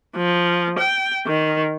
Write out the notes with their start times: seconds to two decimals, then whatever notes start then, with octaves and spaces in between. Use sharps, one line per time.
0.16 F3
0.79 G5
1.26 D#3